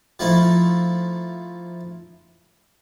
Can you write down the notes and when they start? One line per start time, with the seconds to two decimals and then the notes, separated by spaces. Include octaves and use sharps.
0.19 F3 A3 D#4 E4